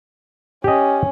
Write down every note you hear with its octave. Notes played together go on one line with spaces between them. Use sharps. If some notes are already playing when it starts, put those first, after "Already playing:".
C#4 G4 D#5